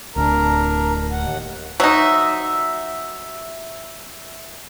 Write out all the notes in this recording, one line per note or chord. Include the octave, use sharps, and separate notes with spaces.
D1 D2 D4 A#4 A#5
D#2 F#5
F#3 D#4 E5